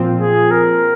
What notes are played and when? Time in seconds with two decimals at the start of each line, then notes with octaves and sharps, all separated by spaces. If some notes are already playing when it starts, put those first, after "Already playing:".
Already playing: A#2 F3 C4 F4
0.20 G#4
0.51 A#4